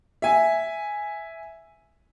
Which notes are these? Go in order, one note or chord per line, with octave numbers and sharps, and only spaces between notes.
E5 G#5